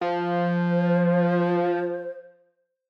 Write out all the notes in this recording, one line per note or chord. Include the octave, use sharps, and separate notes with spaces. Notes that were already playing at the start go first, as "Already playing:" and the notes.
F3 C5